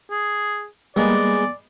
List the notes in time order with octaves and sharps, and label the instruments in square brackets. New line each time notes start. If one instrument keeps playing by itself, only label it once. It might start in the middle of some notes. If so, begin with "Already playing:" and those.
[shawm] G#4
[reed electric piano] G3 A#3 [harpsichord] G#3 B3 [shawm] D5